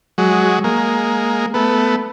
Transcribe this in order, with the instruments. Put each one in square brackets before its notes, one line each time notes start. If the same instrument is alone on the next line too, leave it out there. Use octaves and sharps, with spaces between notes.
[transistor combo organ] F#3 G#3
G#3 A#3
A3 B3